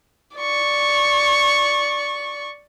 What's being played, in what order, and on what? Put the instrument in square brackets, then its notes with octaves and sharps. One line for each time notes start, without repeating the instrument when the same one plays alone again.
[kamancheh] D5 C#6